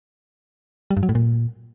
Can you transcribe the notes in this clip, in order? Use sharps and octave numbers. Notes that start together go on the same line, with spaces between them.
G3
G2
F#3
A2
A#2